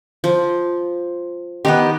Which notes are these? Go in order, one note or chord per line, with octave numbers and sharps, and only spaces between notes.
F3
D#3 B3 D#4 G4